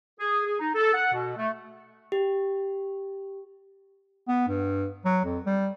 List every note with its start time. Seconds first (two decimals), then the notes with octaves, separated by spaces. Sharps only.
0.19 G#4
0.45 G#4
0.59 D#4
0.75 A4
0.94 F#5
1.13 B2
1.37 A3
2.12 G4
4.28 B3
4.48 G2
5.05 F#3
5.25 F2
5.46 G3